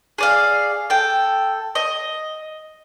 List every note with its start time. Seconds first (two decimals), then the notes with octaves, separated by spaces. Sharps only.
0.18 G#4 D5 F5
0.90 A4 G5
1.75 D#5